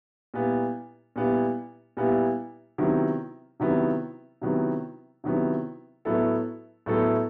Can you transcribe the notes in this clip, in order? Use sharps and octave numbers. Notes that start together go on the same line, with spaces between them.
A#2 G3 B3 E4
A#2 G3 B3 E4
A#2 G3 B3 E4
C3 D#3 F#3 B3 E4
C3 D#3 F#3 B3 E4
C3 D#3 F#3 B3 E4
C3 D#3 F#3 B3 E4
A2 F#3 B3 E4 A4
A2 F#3 B3 E4 A4